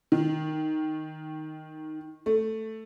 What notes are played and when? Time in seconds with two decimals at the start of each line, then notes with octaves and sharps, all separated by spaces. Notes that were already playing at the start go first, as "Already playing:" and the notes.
0.12 D#3
2.26 A3